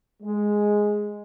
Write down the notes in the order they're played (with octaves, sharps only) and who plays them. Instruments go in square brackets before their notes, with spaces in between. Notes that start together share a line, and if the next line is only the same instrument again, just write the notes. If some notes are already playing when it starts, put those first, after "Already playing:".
[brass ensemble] G#3